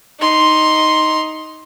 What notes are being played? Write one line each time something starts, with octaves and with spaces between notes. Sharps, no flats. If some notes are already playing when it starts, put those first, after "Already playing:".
D#4 C6